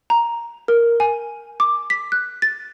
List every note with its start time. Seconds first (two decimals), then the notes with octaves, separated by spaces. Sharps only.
0.10 A#5
0.68 A#4
1.00 G#5
1.60 D6
1.90 B6
2.12 F#6
2.42 A6